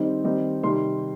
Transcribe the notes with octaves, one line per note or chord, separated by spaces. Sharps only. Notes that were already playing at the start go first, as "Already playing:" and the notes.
Already playing: D#3 G3 C4 D#4
D#3 G3 C4 D#4
C3 D#3 G3 C6